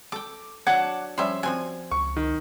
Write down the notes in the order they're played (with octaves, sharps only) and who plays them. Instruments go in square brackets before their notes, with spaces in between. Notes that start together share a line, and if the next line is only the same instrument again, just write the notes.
[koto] A4 G5 [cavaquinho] D6
[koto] F#3 D4 [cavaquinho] F#5 A5 D6 [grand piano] G#6
[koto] F3 G3 C#4 [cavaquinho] E5 C6
[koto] F3 C4 F#4 [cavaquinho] G#5
[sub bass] C#2 [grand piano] C#6
[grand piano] D#3